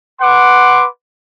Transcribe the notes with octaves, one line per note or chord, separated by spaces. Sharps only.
B4 F#5 C6 D6